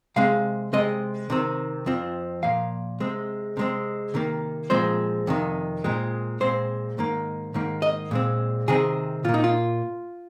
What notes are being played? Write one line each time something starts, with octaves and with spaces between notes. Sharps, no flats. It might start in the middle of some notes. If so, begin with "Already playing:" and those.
C3 G#3 C4 F5
C3 G#3 C4 D#5
C3 D#3 C4
F2 F3 C4
A#2 F3 A#3 F5
C3 G#3 C4
C3 G#3 C4
C3 D#3 A#3
A#2 F3 G#3 C4 C5
F2 C3 D#3
A#2 G#3 C4
A#2 G#3 C4 C5
G#2 D#3 A#3
G#2 D#3 A#3
D#5
A#2 G#3 C4
C3 D#3 C4 G#4
A#2 A#3 F4
D#4
F4